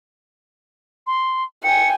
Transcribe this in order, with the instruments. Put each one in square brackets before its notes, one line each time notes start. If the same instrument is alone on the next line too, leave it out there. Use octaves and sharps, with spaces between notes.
[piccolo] C6
[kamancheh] G5 G#5 [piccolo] C#7